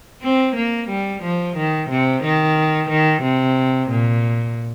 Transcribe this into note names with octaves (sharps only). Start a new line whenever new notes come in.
C4
A#3
G3
F3
D#3
C3
D#3
D#3
C3
A#2